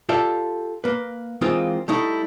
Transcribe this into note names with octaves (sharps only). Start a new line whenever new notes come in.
F4 G4 A4 D5 E5
A#3 B4
E3 G#3 A#3 C4 D#4 F4
G3 A3 D#4 E4